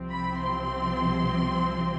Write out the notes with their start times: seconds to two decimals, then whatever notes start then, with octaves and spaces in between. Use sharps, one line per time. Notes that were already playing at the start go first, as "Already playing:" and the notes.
Already playing: C2 C3 F3 C4
0.10 B5
0.39 C6